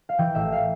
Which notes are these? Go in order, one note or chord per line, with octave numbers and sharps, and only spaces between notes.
F5
E3 G5
A1 E5
F5